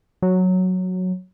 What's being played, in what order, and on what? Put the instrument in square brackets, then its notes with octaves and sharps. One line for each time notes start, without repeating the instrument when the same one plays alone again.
[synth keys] F#3